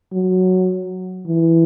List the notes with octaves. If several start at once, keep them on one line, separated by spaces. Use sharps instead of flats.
F#3
E3